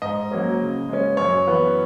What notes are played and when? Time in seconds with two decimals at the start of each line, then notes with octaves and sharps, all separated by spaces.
0.02 G#2 D#5
0.31 F#3 A#3 C#4
0.60 C#3
0.89 G#3 C#4
1.17 F#2 C#5
1.47 E3 B3